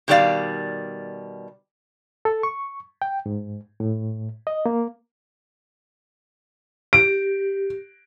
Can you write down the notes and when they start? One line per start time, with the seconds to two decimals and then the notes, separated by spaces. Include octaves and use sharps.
0.08 B2 D#3 G3 A#3 D5 F5
2.25 A4
2.43 C#6
3.02 G5
3.26 G#2
3.80 A2
4.47 D#5
4.66 A#3
6.93 G4 D7